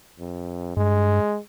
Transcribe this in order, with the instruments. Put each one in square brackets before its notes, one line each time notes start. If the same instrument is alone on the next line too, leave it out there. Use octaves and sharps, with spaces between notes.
[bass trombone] F2
[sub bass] G2 [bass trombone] G#3